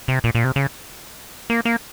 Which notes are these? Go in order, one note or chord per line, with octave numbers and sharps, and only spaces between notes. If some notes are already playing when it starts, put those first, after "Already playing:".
C3
A#2
A#2
C3
C#3
A#3
A#3